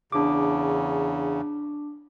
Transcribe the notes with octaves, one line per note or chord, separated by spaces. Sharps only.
E2 C#3 D4 D6